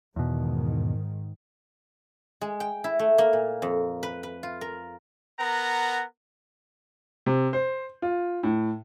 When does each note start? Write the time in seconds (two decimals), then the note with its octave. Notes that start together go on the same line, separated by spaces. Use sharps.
0.16 E2 G#2 B2 D#3
2.41 G#3
2.60 G5
2.84 E4
2.99 A3
3.18 A#3
3.33 A#2
3.62 F2
4.03 B4
4.23 B4
4.43 F4
4.61 A#4
5.38 B3 A#4 F#5 A#5
7.26 C3
7.53 C5
8.02 F4
8.43 A2